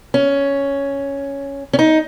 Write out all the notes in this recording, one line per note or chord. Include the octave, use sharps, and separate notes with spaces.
C#4
C#4
D#4